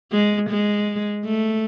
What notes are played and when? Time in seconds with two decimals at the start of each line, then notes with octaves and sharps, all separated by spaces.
0.12 G#3
0.50 G#3
1.25 A3